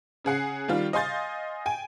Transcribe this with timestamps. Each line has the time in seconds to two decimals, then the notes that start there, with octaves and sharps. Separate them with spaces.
0.25 C#3 G#4 F#5 C7
0.68 D#3 G3 F4
0.93 D#5 F5 G#5 C6 G6 A6
1.66 G5 G#5